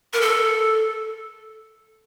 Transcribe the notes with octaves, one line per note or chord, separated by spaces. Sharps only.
A#4
A4